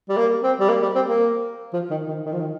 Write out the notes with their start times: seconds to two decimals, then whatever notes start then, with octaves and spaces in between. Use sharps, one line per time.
0.09 G3
0.17 A#3
0.43 C4
0.60 G3
0.69 A#3
0.82 G3
0.95 C4
1.08 A#3
1.73 F3
1.90 D#3
2.08 D#3
2.25 D#3
2.32 F3
2.40 D#3